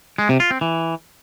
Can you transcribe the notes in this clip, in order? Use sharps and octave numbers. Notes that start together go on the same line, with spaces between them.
G#3
C3
F4
C4
E3